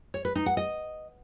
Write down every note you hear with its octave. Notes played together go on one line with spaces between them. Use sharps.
C#5
B4
D#4
F#5
D#5